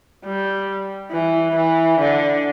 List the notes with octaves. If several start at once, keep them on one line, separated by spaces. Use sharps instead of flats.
G3
E3
E3
D3